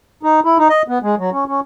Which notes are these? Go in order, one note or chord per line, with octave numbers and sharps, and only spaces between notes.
D#4
E4
D#4
D#5
B3
G#3
F#3
C#4
C#4